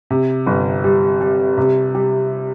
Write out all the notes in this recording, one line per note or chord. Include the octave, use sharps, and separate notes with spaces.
C3
G1
G3
G3
C3
G3